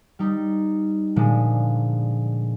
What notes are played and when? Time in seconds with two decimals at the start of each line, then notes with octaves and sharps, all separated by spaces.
0.19 G3 D#4
1.16 A#2 D3 F3 G#3